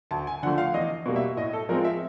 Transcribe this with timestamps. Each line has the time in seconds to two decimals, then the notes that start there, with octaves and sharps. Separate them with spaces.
0.11 D2 A5
0.27 G#5
0.43 D3 F3 A3 F#5
0.58 F5
0.74 E2 D#5
1.06 B2 G3 A#3
1.16 E5
1.37 A2 D#5
1.53 A4
1.69 F3 G#3 C4 A#4
1.85 E5